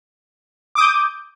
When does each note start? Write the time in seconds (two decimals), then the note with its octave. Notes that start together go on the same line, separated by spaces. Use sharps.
0.75 D6
0.78 D#6
0.81 G6